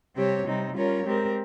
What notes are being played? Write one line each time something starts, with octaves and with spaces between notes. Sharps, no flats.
C3 G3 C4 G4 C#5
C3 G3 C4 D#4
G3 C#4 F4 A#4 C#5
G#3 C4 G4 A#4